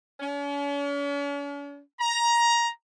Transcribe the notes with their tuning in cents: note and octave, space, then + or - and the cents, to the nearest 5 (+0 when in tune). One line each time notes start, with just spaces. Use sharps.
C#4 +45
A#5 +15